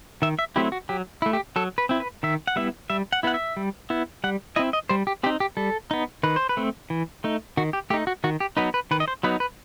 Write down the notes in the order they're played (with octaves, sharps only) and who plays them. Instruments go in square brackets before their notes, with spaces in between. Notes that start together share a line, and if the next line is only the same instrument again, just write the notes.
[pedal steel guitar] D#3 E5
E5
F#3 A3 C4 E4 G4
F#4
F#3 G4
A3 E4
G4
F#3 A4
B4
C4 E4
B4
D#3 E5
F#5
G3 B3 E4 E5
G3 E5
F#5
B3 E4 F#5
E5
G3
B3 E4
G3 F#5
C4 E4 D#5
D#5
G3 C5
G4
C4 D#4 G4
G4
G3 A4
B3 D#4
D#3 B4
C5
B4
A3 C4
E3
A3 D#4
D#3 F#4
G4
A3 G4
D#4
F#4
D#3 F#4
G4
F#3 B3 D#4 B4
B4
D#3 B4
D#5
C5
F#3 B3 D#4 B4
B4